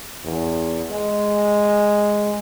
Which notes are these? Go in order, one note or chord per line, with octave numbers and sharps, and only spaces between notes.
E2
G#3